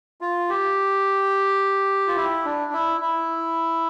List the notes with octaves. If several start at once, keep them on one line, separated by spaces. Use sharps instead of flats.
F4
G4
F4
E4
D4
E4
E4